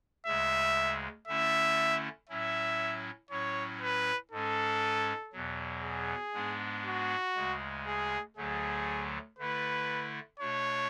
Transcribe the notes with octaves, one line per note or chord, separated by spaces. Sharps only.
D2 C#3 G#3 E5
D3 A3 C#4 E4 E5
A2 F#3 C#4 E4 E5
A2 F#3 C#4 E4 C#5
B4
G#2 G#3 C#4 A4
E2 B2 F#3
G#4
G#2 G#3 B3 D4
F#4
D2 C#3 G#3
G#4
D2 D3 F#3 A3 G#4
D3 A3 E4 B4
B2 A3 D4 C#5